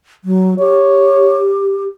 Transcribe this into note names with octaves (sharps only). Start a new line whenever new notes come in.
F#3
G4 C#5